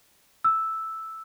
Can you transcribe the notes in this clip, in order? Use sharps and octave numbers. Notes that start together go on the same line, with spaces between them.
E6